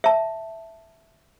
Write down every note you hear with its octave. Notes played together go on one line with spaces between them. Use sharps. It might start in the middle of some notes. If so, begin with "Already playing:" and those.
E5 A5